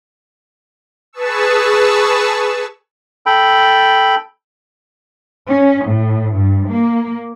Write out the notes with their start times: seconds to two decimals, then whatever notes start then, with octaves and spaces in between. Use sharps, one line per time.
1.13 G#4 B4 A5 C#6 E6
3.26 A4 G5 B5
5.50 C#4
5.85 A2
6.34 G2
6.69 A#3